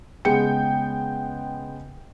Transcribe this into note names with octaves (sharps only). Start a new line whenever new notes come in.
C#3 G#3 B3 G#4 G5 C#7